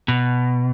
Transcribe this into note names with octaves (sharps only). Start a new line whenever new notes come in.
B2